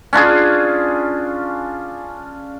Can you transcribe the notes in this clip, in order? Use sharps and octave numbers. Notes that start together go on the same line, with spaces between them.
C#4 D4 F4 G#4